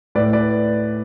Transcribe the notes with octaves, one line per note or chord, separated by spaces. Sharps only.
A2 B4 D5
B4 D5